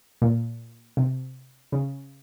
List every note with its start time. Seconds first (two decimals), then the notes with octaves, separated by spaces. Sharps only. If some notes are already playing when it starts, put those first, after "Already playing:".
0.22 A#2
0.97 C3
1.72 C#3